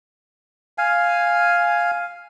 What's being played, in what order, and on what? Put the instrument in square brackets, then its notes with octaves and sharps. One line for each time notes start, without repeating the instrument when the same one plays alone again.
[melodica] F5 G#5